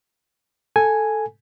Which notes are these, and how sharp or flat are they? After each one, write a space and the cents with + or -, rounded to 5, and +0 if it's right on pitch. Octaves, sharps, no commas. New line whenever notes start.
A4 +0 G#5 +0